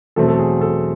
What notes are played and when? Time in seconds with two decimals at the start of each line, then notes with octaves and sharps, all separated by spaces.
0.16 E2 B2 F#3 A3 C4 A4
0.28 A4
0.39 G#4
0.61 A4